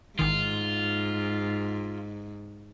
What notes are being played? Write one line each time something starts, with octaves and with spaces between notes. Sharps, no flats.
A1 G#2 D#3 F4